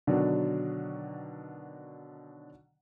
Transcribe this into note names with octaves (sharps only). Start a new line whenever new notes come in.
B2 D3 D#3 F#3 D4